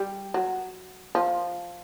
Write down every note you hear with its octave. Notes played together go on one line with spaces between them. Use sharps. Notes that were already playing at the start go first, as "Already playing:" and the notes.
Already playing: G3
F#3
F3